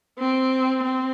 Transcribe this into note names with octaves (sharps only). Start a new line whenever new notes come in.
C4
C4